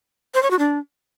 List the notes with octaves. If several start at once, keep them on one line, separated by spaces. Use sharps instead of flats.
C5
C#5
F#4
D4